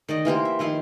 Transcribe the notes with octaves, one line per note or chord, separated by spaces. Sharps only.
D#3 D5 D#5
E3 A#3 G4 C5
E5
D#3 F3 E4 C6